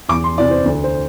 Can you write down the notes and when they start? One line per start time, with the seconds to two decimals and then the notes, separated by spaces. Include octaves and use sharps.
0.09 E2 D6
0.24 C6
0.38 C3 E3 D5
0.51 C5
0.66 D2
0.84 C5